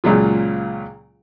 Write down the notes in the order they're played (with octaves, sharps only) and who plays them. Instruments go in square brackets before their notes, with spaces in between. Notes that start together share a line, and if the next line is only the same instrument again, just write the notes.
[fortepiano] C#2 A#2 C#3 F#3 F4